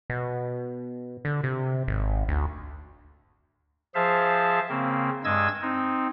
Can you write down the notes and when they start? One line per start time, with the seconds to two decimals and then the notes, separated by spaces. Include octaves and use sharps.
0.10 B2
1.25 D3
1.43 C3
1.88 G#1
2.28 D2
3.95 F3 G#4 C5 E5 F5 A5
4.69 C#3 A#3 C4
5.24 G2 G#3 D#5 E6 G#6 A6
5.62 C4 D#4